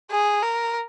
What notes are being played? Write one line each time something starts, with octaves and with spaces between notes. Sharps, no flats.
G#4
A#4